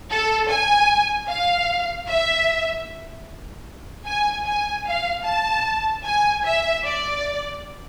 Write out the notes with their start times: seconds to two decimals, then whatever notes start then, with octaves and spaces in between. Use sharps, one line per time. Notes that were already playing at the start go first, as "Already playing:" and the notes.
0.11 A4
0.49 G#5
1.29 F5
2.08 E5
4.07 G#5
4.46 G#5
4.85 F5
5.25 A5
6.05 G#5
6.44 E5
6.84 D5